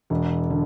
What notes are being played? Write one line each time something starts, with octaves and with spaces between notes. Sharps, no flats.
E1
D3